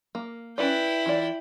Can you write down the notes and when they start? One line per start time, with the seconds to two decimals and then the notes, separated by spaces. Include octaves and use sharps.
0.15 A#3
0.58 C#4 E4 B4 D5 G5
1.06 E3 F4 D5